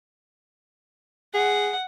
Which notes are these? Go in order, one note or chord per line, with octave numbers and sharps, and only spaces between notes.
G#4 F#5